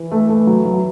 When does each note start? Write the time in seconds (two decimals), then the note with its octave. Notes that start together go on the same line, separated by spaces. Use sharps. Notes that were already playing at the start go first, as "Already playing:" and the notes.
Already playing: E3
0.11 A3
0.29 A3
0.47 F#3
0.65 F#3